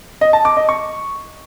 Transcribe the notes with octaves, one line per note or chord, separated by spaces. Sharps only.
D#5
A5
D6
D#5
C#6